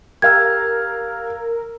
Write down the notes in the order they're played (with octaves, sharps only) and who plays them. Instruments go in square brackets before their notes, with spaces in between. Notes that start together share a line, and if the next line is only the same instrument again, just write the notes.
[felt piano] G4 F5 E6 [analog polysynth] A#4 [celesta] G#6